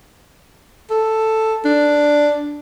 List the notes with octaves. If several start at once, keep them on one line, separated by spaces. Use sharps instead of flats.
A4
D4